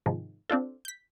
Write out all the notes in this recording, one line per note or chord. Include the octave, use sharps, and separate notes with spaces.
G#2 C3 D#3 F3 G#3
C4 D4 F4 A4
G6 B6